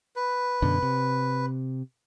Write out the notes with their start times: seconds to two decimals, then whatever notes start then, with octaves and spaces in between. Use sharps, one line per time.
0.16 B4
0.62 F#2 B2 D3
0.83 C3